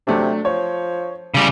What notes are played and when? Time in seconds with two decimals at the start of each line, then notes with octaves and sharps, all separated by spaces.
0.07 C3 F#3 A3 D4
0.45 F3 C#5
1.34 C#3 G3